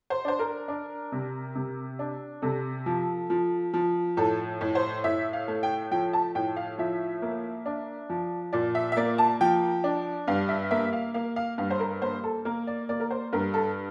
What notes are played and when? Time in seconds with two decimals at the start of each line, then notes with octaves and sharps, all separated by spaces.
0.10 C5
0.25 D4 C5
0.39 A#4
0.68 D4
1.12 C3
1.55 C3
1.99 D4
2.42 C3 A4
2.86 F3
3.30 F3
3.74 F3
4.17 A2 A4
4.61 A2
4.75 C5
5.04 A2 E5
5.33 F5
5.48 A3
5.63 G5
5.91 F3 G5
6.13 A5
6.35 A2 G5
6.56 F5
6.78 F3 E5
7.22 A#3
7.66 D4
8.09 F3
8.53 A#2 D5
8.75 E5
8.92 E5
8.97 A#3 D5
9.18 A5
9.41 F3 G5
9.84 D4
10.28 G2 F5
10.49 E5
10.71 A#3 E5
10.93 F5
11.14 A#3 F5
11.36 F5
11.58 G2 F5
11.70 C5
11.80 A#4
12.02 A#3 C5
12.24 A4
12.45 A#3 A#4
12.67 D5
12.89 A#3 D5
13.00 A#4
13.10 C5
13.33 G2 A#4
13.54 A4